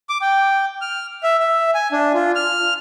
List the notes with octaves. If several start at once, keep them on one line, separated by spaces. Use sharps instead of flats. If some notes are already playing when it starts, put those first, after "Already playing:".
D6
G5
F6
E5
E5
G#5
D4
F4
F6